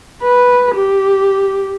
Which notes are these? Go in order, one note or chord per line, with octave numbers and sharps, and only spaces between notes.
B4
G4